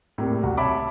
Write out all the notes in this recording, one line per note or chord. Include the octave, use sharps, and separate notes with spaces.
A2 C3 G3 A#3
C2 F#4
C#5 E5 A5 B5 D6